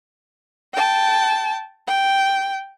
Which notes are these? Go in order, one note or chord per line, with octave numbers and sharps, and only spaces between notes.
G5 A5
G5